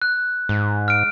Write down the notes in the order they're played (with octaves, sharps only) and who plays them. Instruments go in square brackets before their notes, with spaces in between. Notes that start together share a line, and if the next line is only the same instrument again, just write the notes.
[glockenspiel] F#6
[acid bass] G#2
[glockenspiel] F6 D7